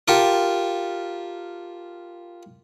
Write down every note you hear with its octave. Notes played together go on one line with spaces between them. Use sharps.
F4 G4 A4 A#4